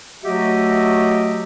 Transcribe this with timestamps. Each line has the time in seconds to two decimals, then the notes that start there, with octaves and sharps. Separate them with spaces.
0.23 F#3 A3 F#4 G4 D#5 E5